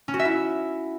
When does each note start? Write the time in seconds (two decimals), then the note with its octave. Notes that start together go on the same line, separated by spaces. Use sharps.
0.08 C#4
0.14 F#4
0.19 E5
0.25 E4